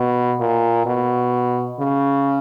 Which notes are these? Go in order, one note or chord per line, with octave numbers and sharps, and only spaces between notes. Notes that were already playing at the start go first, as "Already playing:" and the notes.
Already playing: B2
A#2
B2
C#3